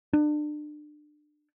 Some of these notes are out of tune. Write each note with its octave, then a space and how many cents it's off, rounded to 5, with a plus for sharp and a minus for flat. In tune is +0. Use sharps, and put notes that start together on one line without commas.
D4 +30